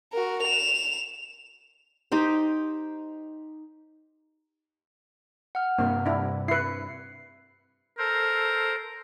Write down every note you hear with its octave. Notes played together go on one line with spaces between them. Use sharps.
F#4 A#4
E7 F7
D#4 G4 C5
F#5 F6
G2 C3 A#3
D4 E4
E4 B4 C7 C#7
A4 A#4 C5